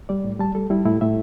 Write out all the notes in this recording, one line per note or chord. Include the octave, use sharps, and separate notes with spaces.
G3 D5
A2
G3 A5
G3 A4
G3 E4
A2 E4
A2 E5